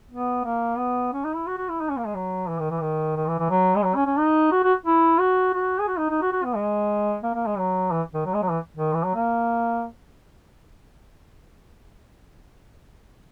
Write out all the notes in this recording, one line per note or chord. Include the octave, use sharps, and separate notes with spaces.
B3
A#3
B3
C#4
D#4
E4
F#4
F#4
E4
D#4
C#4
A#3
G#3
F#3
E3
D#3
E3
D#3
D#3
E3
E3
F#3
G#3
F#3
C#4
C#4
D#4
F#4
F#4
E4
F#4
F#4
G#4
F#4
D#4
D#4
F#4
F#4
B3
G#3
A#3
A#3
G#3
F#3
E3
D#3
F#3
G#3
F#3
E3
D#3
E3
F#3
A#3